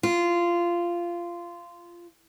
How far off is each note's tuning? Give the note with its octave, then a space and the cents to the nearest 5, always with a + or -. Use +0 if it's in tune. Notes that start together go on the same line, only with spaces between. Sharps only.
F4 -15